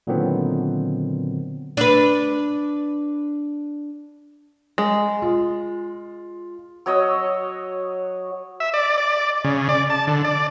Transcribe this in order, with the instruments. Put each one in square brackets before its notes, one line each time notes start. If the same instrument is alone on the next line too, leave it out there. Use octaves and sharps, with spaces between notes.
[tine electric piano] A#2 D3 D#3 F#3 B3 C4
[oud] D4 B4
[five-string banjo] G#3
[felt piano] F4
[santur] F#3 C#5 D#5 E6
[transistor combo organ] E5
D5
D5
C#3
D5
A5
D3
D5